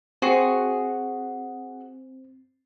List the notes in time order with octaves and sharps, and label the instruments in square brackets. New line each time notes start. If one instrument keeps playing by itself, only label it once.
[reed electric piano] C4 [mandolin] F#4 G#4 C#6